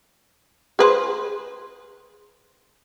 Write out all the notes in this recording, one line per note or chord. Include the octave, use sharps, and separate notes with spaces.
G#4 B4 C5